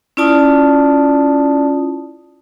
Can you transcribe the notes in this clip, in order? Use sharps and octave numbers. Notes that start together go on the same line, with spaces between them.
C#4 E4 F4 D5 A5 D#6